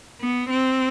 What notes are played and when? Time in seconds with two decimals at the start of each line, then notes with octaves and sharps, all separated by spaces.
0.21 B3
0.50 C4